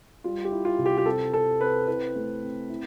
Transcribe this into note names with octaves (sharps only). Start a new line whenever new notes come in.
G3 F4
G4
E4
F4
C3
G4
G4
C4 A4
C4 A4
C4 B4
E4 B4
A3
C4
E4